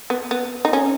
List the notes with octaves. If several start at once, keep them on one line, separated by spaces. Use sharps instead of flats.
B3
B3
D#4
C#4